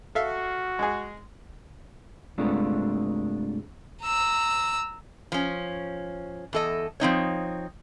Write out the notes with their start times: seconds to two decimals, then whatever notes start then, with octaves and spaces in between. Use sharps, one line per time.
0.15 F#4 A4 E5 F5
0.79 G#3 G#4
2.38 G2 C3 G#3 A3 D4 F4
4.03 A#5 E6
5.32 F3 C#4
6.53 E2 A4 D#5
7.00 F3 C4 D#4 C#5